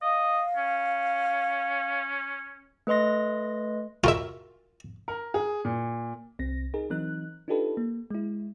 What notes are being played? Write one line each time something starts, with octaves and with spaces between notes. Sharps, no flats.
D#5 F5
C#4
A3 B4 D#5 C6 A#6
F4 F#4 A#4 E5
A#4
G#4
A#2
C2 C4 A#6
D#4 G#4 A#4
E3 F#3 C4 D#4 A#4 F#6
D4 D#4 F4 G4 A4 B4
A#3
G#3 E4